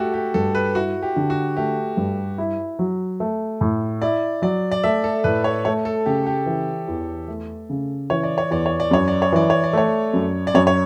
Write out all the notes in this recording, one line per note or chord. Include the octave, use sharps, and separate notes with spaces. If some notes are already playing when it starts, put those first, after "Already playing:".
Already playing: A3 F#4 G4 A4
G4
G2 A4
B4
E4 F#4
G4
D3
F#4
A3 G4
G2
E4
F#3
A3
A2
E4 D5
F#3 D5
D5
A3 E5
A4
A2 B4
C#5
A3 C#5
A4
C#3 G4
G4
E3
E2
A3
C#3
E3 C#5
D5
C#5
E2 D5
C#5
D5
F#2 C#5
D5
C#5
E3 D5
C#5
D5
A3 C#5
F#2
D5
F#2 C#5
C#5